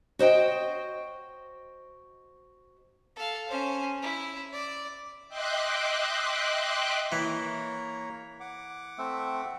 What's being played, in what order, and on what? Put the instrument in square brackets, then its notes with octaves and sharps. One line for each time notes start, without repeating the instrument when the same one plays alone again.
[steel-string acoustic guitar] F#4 C5 D#5 G5
[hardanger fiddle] A4 F5
C#4 C5
E4
D5
[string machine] D#5 E5 G5 C6 D6 F#6
[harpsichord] E3 [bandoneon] A#3 C#5 A#5
[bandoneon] F#5 D6
[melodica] A3 C4 E5